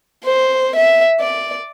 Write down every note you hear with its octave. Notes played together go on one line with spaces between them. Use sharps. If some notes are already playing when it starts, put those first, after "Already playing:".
C5
E5
D5